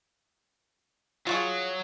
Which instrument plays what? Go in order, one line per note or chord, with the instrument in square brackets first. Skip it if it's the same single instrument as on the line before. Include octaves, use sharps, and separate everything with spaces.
[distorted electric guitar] F#3 [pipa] F4 F#4 G#4